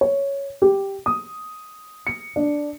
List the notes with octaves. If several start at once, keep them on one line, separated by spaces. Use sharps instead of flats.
C#5
G4
D#6
C#7
D4